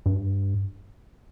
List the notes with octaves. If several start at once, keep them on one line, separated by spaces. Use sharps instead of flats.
G2